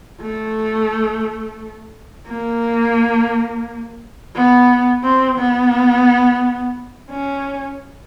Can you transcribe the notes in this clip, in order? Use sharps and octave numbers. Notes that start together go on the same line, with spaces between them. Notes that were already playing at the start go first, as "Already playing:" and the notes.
A3
A#3
B3
C4
B3
C#4